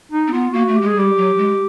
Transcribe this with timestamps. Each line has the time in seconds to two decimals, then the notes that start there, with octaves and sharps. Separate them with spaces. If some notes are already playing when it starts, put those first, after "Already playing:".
0.12 D#4
0.28 C4
0.32 B3 F4
0.53 A#3 F#4
0.68 A3
0.75 G4
0.82 G#3 G#4
0.96 G3 G4
1.17 F#3
1.38 G#3